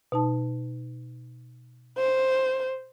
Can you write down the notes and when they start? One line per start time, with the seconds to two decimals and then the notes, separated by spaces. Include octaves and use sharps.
0.12 B2 D#4 A5
1.97 C5